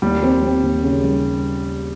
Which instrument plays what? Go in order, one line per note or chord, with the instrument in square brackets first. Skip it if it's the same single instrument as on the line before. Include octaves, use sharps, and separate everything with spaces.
[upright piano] D#2 [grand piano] G3
[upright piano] C4
C4
D#2
C#3
G3